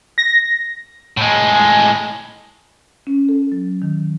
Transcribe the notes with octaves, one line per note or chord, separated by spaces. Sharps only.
A#6
A2 G#3
C#4
A4
F#3
D#3